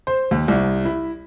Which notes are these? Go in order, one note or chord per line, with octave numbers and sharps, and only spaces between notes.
C5
D#2
C2
E4